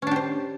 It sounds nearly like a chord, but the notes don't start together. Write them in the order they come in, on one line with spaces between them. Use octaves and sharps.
C#4 D4 G4 C5